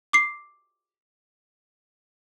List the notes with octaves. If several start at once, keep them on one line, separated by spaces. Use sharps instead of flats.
D6 C7